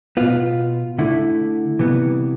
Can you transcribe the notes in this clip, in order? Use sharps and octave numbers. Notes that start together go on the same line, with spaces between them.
B2 B3 F4
D3 A3 E4
C3 E3 G3 B3